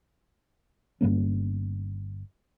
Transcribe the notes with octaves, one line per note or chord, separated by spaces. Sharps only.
G1 F#2 A#3 C#4